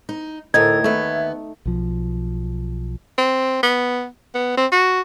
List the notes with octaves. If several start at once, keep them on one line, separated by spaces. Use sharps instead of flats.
D#4
D2 A2 D#4 A4 A#4 G#6
D#2 A3 B3 E5
B1 F3
C4
B3
B3
C4
F#4